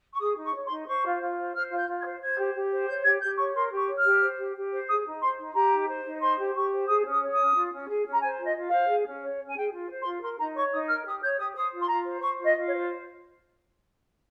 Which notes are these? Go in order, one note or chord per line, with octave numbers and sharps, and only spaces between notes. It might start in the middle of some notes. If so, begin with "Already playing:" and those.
C#6
G#4 D#6
D#4
C#6
C#5
C6
D#4
C5 C#6
F4
F4
C5
C5 F6
F4
G6
F4
G#6
C5
C5 G#6
G4
G4
C5
C#5 G6
G4 G#6
G4 G6
C#5 C#6
A#4 C6
G4
C#6
C#5
F6
G4
C5
G4
G4
C5
G#4 D#6
D#4
C5 C6
D#4
G4 A#5
D#4
C5
D#4
C5 C6
G4
G4 C#6
C5
G#4 D#6
C#4
D#6
C#5
D#6
C#4
F4
C#4
G#4
C#4
A#5
C5 G#5
F4
D#5
F4
C5 F5
G#4
C#4
C#5
C#4
G#5
G#4 G5
F4
C5
C6
F4
A#4 C6
D#4 A#5
C#5 C#6
D#4 D#6
A#4 F6
G4 D#6
C#5 G6
G4 D#6
C5 D#6
F4
C6
F4 A#5
C5
C5 C#6
F4
D#5
F4
C#5
C5